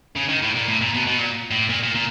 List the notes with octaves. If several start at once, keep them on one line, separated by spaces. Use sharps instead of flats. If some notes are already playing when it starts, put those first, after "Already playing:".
C#3
D#3
A2
A#2
A2
A#2
B2
B2
A#2
A2
A#2
A#2
A#2